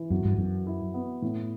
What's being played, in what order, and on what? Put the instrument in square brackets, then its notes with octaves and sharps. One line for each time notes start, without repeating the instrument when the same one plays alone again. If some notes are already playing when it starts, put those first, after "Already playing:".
Already playing: [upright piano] E3
[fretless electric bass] F#2 [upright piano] F#3
[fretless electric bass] G2
[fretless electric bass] F#2 [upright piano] F#3
[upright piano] E4
B3
A2